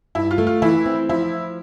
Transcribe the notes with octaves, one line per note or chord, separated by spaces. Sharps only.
G2 E4
F4
A3
F4
E3 E4
C4
F3 E4